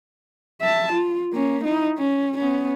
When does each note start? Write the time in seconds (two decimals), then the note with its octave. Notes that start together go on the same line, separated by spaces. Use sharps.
0.61 E5 A5
0.93 F4
1.33 A#3 C#4
1.64 D#4 E4
1.98 C#4
2.38 B3 C#4